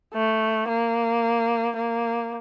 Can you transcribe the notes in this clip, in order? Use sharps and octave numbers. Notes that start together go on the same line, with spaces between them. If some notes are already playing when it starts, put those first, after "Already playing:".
A3
A#3
A#3